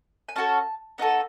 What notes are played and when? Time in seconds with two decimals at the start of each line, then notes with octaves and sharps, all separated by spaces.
0.29 G#5
0.36 C#4 F#4 A4 A5
0.98 B3 D#4 F#4 A4